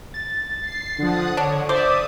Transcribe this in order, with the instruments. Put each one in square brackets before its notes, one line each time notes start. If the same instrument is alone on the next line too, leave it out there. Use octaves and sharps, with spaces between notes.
[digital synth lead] A6
[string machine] C7
[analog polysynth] D3 F3 [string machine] F#5 D#6
[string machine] D3 [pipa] D4 [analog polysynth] C#5
[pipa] C5 [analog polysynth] D5 E5 [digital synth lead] D6 [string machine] D#6